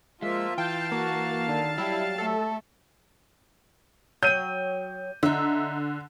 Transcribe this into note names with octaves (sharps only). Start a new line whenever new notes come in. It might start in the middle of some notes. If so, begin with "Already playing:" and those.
F3 G#3 A#3 F4 E5
E3 F5 G5 A5
A#3 F#4
D3 D#3
F#3 G3 E4 G4
A3 A4
F#3 G5 G6 D#7
D3 D#4 E5